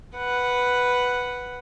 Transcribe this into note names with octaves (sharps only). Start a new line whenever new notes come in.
B4 F#5